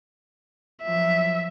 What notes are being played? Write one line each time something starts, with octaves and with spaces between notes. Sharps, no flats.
F3 F#3 E5